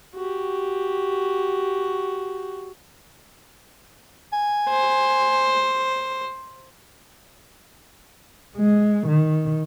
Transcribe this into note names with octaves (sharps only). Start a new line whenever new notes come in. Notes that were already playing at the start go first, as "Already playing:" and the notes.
F#4 G4
G#5
C5
G#3
D#3